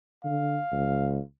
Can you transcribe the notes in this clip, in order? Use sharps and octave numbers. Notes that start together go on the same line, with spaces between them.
D3 F5
C#2